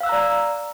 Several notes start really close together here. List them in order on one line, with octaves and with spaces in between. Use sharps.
F5 E6 F#6 A#5 D5